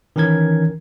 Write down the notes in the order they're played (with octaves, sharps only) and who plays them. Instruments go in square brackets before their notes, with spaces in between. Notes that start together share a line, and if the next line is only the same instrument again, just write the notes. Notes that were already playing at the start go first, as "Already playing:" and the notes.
[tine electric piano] D#3 E3 C#4 A#4 G#6